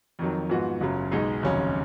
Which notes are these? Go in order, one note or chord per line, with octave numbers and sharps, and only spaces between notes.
F2 D#3 F#3
G#2 F3 B3 F#4
F#1 F#2 C#3 F#3
B1 B2 G#3 D#4 G#4
F1 D#2 C#3 F#3 C#4